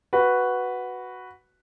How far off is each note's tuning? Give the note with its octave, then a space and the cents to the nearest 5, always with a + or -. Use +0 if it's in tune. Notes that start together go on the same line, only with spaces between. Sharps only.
F#4 +0 B4 +0